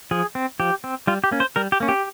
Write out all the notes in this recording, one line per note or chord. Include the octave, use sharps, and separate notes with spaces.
F3 G#4
C4
F3 G4
C4
G3 F4
G4
A#3 C#4
C5
G3 A#4
G4
A#3 C#4
G4